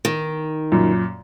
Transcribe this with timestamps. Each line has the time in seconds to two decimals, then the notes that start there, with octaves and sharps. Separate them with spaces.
0.05 D#3
0.72 F#2 A#2